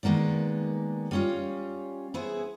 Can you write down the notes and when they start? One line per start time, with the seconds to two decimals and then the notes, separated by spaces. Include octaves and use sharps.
0.03 D#3 G#3 A#3 B3 D5
1.11 G3 C#4 F4
2.14 B3 E4 G#4 C5